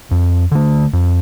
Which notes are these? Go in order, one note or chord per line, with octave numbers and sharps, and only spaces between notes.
F2
D3 A3
F2